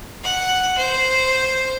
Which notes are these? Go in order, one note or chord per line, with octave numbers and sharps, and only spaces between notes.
F#5
C5